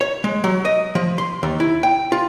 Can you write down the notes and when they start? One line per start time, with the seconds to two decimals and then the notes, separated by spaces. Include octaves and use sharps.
0.01 C#5
0.24 G#3
0.44 F#3
0.65 D#5
0.95 F3
1.18 C6
1.43 D#2
1.60 E4
1.83 G5
2.12 F4